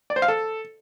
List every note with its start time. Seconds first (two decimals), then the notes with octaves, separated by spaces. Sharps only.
0.10 D5
0.16 C5
0.22 F5
0.28 A4